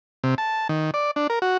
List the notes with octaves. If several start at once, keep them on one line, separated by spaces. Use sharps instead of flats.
C3
A5
D#3
D5
D4
A#4
F#4